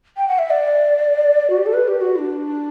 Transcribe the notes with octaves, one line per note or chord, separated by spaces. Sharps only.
G5
F#5
E5
D5
F#4
G4
A4
B4
G4
F#4
E4
D4